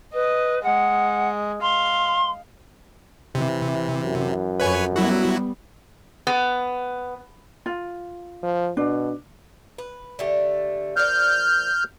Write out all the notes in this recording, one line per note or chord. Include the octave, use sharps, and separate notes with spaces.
B4 D#5
G#3 F#5
F5 C6
C3 E3
F#2
F2 B4 C#5 G#5
F#3 G3 B3 E4 F#4
B3
F4
F3
B2 D4
B4
D3 A3 G4
F3 A#3 D5 F6 G6